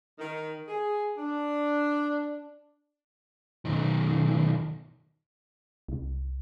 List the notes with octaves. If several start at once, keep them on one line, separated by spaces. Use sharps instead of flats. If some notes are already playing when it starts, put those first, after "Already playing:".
D#3
G#4
D4
B1 D#3
C2